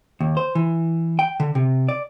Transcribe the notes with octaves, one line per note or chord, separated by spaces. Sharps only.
D#2
C5
E3
G5
D3
C3
D5